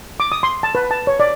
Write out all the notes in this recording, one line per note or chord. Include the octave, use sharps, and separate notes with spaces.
D6
D#6
C6
A5
B4
A5
C#5
D5